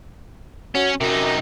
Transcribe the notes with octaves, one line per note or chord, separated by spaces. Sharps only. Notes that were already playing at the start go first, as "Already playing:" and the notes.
F#3 C#4
F#2 C3 D#4